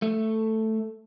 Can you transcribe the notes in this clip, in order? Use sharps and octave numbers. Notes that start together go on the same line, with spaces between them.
A3